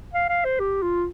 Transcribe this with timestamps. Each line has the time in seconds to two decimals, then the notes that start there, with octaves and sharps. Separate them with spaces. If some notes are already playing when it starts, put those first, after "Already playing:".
0.13 F5
0.29 F5
0.44 C5
0.59 G4
0.82 F4